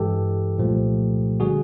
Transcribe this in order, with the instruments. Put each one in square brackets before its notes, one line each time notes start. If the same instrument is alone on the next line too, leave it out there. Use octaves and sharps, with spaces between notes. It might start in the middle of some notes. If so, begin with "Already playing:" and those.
Already playing: [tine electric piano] G2 E3 G#3 G4 A4
C2 A#2 F3 A3
D3 G3 F#4 G#4